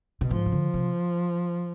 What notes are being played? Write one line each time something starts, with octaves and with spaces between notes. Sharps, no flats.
B2
G#2 F3
C3
D3
C3